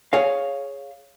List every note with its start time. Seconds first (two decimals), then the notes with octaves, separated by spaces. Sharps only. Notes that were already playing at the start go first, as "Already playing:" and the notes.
0.13 G#4 C#5 F5